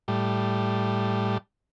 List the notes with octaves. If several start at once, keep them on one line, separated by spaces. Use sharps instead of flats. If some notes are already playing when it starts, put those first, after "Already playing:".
A2 G3